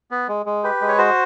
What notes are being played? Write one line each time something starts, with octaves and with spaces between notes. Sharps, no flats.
B3
G#3
G#3
G4 B4
G#3
C#5
F#4 C5